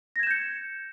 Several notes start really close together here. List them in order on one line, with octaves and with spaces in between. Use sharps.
A#6 G#6 E7 G6 C#7